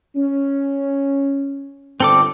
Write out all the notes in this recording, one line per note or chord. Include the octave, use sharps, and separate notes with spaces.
C#4
G1 C4 A4 D6